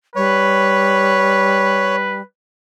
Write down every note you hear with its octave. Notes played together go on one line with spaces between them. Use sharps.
G3 B4 C#5